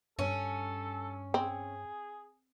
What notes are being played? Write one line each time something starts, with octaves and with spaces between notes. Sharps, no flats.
G2 C#4 A4
C4 G#4